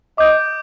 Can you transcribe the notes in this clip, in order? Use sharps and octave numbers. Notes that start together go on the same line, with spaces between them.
D#5 D6 G6 D7